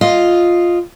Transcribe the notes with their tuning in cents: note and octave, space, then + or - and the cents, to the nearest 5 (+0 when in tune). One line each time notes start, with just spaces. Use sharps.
F4 +0 D#5 +0